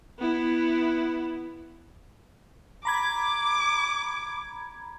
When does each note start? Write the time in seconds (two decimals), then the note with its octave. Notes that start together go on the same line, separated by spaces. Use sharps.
0.19 B3 E4
2.85 A#5 B5 D6 G#6